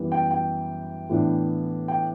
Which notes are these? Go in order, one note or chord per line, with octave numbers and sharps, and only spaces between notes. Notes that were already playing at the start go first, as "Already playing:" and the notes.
Already playing: F#2 E3 G3 B3
G5
G5
A2 E3 B3 D4
G5